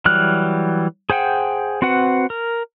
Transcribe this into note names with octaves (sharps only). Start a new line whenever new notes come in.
E3 F#3 G3 F6 F#6
G#4 C5 F#5 G5
C4 F#4 B4 F#5
A#4